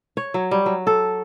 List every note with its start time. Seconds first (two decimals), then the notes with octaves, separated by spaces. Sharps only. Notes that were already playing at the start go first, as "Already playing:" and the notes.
0.17 C#5
0.34 F#3
0.51 G3
0.66 F#3
0.87 A4